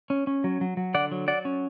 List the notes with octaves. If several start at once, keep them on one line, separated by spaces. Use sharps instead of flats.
C#4
C#4
F#3
F#3
F#3
D3 D5 F#5
F#3
F#3 D5 F#5
C#4